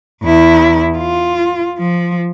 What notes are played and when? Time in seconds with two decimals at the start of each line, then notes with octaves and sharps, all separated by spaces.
0.23 E2 E4
0.98 F4
1.78 F3